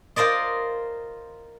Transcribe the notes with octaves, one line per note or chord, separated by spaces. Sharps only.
F4 A#4 C5 D5 D#5